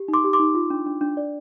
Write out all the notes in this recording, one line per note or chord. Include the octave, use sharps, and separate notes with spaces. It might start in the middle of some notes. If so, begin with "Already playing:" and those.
Already playing: G4
D#4
C6 D6
G4
C6 D6
D#4
F4
D4
D4
D4
D5